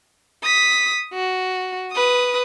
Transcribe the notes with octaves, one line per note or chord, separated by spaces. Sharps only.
D#6 B6
F#4
B4 D#6